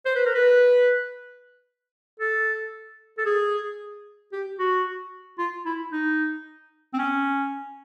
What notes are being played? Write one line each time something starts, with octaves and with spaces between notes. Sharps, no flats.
C5
B4
A#4
B4
A4
A4
G#4
G4
F#4
F4
E4
D#4
C4
C#4